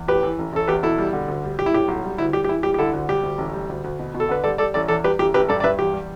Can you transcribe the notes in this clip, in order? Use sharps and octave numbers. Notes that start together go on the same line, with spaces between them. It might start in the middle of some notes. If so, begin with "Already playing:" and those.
Already playing: E2
A2 G4 B4
E3
A1
A1 A4
E2 G4 B4
B2 E4 A4
G3
D3
D2
G3
G3 G4
E4
A2 G4
B1
G3
D2 E4
G3 G4
G4
E3 E4
G3 G4
G4
D3 E4 A4
D2
G3 G4
D2
A1
G3
D2
D2
B2
B2
A4
D3 B4
G3 A4 D5
G3 A4 D5
A1 A4 D5
E2 A4 D5
G3 G4 B4
A1 G4
A1 G4 B4
G2 A4 D5
D5
G2 B4 E5
E2 G4
G3